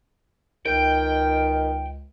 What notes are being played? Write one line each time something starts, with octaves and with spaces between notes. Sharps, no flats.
C#2 D#3 G5